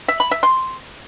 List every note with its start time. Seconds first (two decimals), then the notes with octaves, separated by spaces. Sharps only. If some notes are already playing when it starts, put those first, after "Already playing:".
0.08 E5
0.20 B5
0.31 E5
0.43 C6